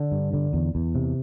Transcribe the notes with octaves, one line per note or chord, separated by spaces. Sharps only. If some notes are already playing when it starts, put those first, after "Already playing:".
Already playing: D3
G2
D3
E2
E2
C3